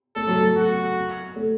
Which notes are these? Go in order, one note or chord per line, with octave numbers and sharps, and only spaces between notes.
A3 A4
F#3
A3
F#4
A3